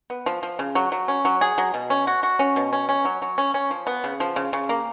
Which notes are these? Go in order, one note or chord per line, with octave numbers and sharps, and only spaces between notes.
B3
F3
F3
C#3
F#3
F#3
C#4
F#3
G#4
F#3
B2
C#4
F#4
F#4
C#4
B2
C#4
C#4
F#3
F#3
C#4
C#4
F3
B3
C#3
F3
C#3
C#3
A#3